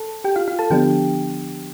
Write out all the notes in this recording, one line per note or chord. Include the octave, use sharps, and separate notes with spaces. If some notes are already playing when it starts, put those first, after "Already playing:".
Already playing: A4 A5
G4 G5
F4 F5
F4 F5
A4 A5
D3 F3 B3 D4 G4 G5